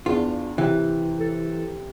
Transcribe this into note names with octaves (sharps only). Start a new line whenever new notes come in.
E2 D4 F4
C3 E3
A4